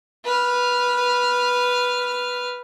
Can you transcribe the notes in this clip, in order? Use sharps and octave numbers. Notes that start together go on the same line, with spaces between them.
B4 F6